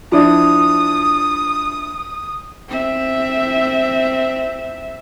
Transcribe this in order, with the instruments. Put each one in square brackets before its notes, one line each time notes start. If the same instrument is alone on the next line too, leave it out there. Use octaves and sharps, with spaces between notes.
[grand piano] F3 D4 E4 [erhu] D#6
[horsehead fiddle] C4 E5